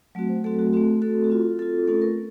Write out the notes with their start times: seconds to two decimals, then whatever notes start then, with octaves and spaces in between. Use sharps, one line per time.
0.15 F#3 A3 C4 F#4
0.29 C5
0.44 F#3 A3 C4 F#4 A4
0.59 F#4
0.73 A3 C4 F#4 A4
1.02 A3 C4 F#4 A4
1.24 F#4
1.30 C4 F4 A4
1.59 C4 F4 A4
1.88 A3 C#4 F4 A4
2.02 A#4